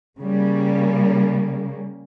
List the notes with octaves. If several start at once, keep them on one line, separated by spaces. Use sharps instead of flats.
C#3 G3 A#3